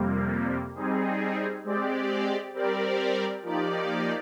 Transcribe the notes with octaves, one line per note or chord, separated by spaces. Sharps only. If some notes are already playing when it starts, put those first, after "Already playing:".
Already playing: F2 C3 G3 A#3
G3 C4 D#4 G#4
G#3 C4 G4 D5
G3 C4 G4 A#4 D5
F3 A#3 D#4 G4 D5